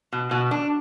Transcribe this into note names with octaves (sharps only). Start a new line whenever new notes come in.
B2
B2
D4